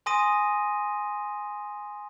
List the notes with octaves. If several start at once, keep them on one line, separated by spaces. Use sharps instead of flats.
G#5 C6 D#6 A#6 D#7